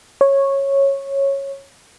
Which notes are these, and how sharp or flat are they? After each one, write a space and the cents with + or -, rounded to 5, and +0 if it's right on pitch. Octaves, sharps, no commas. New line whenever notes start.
C#5 -10